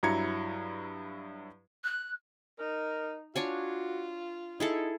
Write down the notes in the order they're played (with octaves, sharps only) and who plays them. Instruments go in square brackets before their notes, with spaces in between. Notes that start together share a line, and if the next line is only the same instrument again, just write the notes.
[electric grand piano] G2 F#3 E4 A#5 G#6 C#7
[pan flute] F#6
[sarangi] D#4 [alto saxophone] A#4
[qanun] D4 C#5 G#5 [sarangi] F4 [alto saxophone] F#4
[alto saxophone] D#4 [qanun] E4 G#4 A4